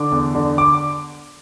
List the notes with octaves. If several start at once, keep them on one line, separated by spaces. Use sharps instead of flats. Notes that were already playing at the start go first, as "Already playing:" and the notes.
Already playing: D3 D6
E2
D3
D6